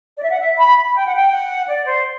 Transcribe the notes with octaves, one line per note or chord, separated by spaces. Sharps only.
D5
E5
F#5
E5
B5
G5
F#5
G5
F#5
D5
C5